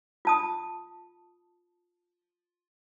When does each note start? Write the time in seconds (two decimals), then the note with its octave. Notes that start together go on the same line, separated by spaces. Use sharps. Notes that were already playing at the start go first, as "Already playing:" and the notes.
0.25 F4 A5 D#6